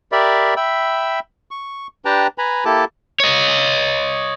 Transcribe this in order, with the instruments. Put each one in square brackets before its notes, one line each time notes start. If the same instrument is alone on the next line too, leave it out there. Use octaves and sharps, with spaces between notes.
[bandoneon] G4 A#4 D5 E5 B5
E5 G5 B5 E6
C#6
D4 G4 B4 G5 A5 A#5
B4 G#5 A#5 B5
A#3 E4 G4 A4 A5 D6
[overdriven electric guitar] C#5 D#5